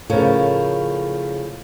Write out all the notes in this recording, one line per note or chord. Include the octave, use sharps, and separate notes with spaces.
A2 C#3 F3 A4 A#4